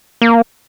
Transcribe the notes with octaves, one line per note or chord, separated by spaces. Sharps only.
A#3